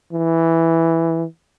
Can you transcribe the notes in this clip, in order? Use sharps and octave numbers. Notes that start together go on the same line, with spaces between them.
E3